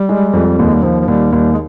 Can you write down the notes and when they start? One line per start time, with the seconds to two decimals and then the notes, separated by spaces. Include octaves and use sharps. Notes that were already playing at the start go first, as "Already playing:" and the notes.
Already playing: G3
0.09 G#3
0.33 F2
0.58 D#2 G3
0.67 G#3
0.75 G3
0.83 D#2 F3
1.00 F3
1.08 D#2 G3
1.32 D#2 G3
1.53 G#3